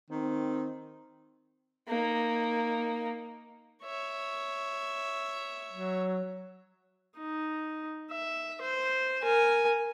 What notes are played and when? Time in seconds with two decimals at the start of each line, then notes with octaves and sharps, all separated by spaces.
0.10 D#3 C4
1.88 A#3 D#4
3.84 C#5 E5
5.72 F#3
7.18 D#4
8.11 E5
8.62 C5
9.22 A#4 G#5